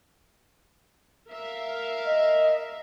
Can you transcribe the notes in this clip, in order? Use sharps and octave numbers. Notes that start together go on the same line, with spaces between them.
A#4 E5 F5
D#5